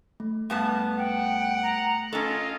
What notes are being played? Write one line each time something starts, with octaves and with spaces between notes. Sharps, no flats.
A3
G2 B3 A5
F#5 G5
A#5
C#4 F4 A4 D#5